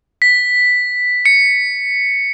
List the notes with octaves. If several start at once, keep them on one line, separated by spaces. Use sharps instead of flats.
B6
C#7